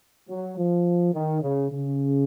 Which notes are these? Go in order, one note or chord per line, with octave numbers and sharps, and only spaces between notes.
F#3
F3
D#3
C#3
C#3